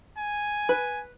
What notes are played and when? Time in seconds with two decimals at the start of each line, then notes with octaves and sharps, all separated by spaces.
0.18 G#5
0.69 B4